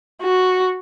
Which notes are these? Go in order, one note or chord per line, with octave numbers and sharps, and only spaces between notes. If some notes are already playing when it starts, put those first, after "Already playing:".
F#4